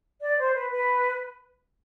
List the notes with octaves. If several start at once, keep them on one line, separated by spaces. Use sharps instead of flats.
D5
C5
B4
B4